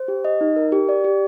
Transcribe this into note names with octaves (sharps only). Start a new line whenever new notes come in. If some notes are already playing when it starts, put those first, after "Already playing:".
Already playing: C5
G4
D#5
D#4
A#4
G4
D5
G4